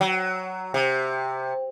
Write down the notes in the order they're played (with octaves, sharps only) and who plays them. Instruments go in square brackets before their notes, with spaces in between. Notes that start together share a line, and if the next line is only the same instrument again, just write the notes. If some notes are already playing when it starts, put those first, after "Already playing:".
[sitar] F#3
C3